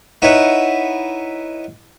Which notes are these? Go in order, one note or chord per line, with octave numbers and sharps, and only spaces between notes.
D#4 E4 B4 C#5 F#5